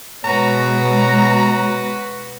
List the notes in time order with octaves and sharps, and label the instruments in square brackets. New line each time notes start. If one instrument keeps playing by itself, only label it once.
[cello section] B2 G#3 [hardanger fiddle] F#4 B4 [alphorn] C#5 [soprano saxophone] A#5